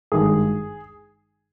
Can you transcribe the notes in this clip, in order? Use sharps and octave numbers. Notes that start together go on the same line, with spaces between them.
G#1 G2 D#3 G#3 G#4